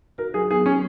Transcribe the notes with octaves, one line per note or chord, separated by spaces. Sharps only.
F#4 A#4
F#3 G#4
B3 G#4
F#3 C#4